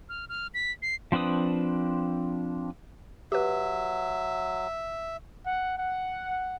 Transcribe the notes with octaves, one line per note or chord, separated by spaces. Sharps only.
F6
F6
B6
C7
F3 C4 D4 B4 D#6
F#3 G4 B4 E5
F#5
F#5